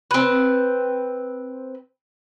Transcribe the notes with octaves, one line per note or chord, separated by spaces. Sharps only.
C4 B4